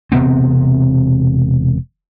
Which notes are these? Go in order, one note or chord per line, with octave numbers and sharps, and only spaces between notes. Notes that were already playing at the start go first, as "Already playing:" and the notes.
E1 C3 B3 C4